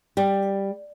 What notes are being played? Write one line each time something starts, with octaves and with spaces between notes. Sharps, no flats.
G3